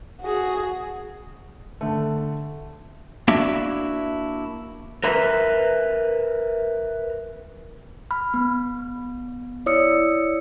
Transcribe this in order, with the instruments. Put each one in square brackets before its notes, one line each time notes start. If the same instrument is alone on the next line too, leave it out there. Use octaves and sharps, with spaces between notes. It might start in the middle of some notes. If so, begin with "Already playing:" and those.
[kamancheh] F#4 G#4
[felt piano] D3 A3
[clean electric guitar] A#3 D4 E4 F#4 E5
[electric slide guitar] A#4 B4 E5
[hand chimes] B5 F6
B3
E4 C#5 D5 D#6 E6 C#7